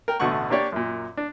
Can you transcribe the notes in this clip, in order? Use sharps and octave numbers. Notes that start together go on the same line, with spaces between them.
A#4 G5
A1 B2 D3 A3 F#5 C#6
A#3 D4 G4 C#5 D5
F#2 A#2
D4